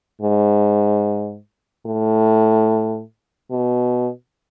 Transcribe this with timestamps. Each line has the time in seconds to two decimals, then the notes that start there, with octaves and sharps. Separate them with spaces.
0.21 G#2
1.86 A2
3.51 B2